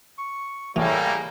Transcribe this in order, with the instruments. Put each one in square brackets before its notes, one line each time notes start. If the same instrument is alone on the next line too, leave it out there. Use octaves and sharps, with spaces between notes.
[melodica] C#6
[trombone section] A2 [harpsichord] E3 [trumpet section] G3 A3 A#3 [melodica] G#4